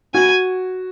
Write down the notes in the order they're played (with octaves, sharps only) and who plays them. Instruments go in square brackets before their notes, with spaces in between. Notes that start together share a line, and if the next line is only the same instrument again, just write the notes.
[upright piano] F#4 [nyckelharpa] G#5